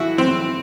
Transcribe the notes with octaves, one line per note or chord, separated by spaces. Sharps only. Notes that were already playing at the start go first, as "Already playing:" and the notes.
Already playing: A2 E3 E4 F#4
C4